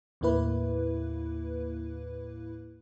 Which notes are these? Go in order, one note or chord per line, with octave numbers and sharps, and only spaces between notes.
D#2 A2 A#3 E4 B4